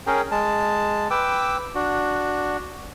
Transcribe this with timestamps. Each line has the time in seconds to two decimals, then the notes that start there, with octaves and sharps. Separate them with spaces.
0.07 C#4 G#4 A#4 G5
0.31 G#3 A5
1.10 B4 G5 D6 E6
1.75 D4 F#4